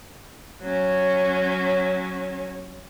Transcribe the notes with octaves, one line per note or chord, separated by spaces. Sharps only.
F#3 C#4